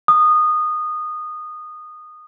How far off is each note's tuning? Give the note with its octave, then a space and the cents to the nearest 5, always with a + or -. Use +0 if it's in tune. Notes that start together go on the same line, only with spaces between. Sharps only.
D#6 -20